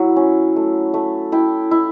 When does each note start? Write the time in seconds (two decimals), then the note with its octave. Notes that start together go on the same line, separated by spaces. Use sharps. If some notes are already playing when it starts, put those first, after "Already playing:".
Already playing: F#3 E4
0.16 C#4
0.56 A3
0.94 A3
1.32 E4 G5
1.71 E4